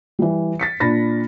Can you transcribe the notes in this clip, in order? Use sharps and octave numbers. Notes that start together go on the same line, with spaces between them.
E3 G3
A6 B6 C#7
A#2 D4 B5 A6 A#6